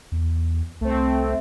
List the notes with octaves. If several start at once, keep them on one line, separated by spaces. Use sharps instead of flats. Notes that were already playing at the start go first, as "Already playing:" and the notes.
E2
C2 A3 C4